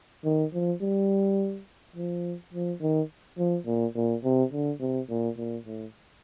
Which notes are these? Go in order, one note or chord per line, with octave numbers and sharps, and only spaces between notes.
D#3
F3
G3
F3
F3
D#3
F3
A#2
A#2
C3
D3
C3
A#2
A#2
A2